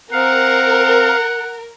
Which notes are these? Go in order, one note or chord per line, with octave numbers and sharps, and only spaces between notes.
C4 A#4 F5 F#5